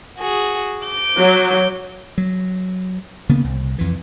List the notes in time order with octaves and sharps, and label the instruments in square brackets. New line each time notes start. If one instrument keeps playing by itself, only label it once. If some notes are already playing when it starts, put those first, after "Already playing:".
[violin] F#4 G#4
D6 G6
[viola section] F#3
[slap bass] F#3
C#3 A#3 B3
C2
F2 E3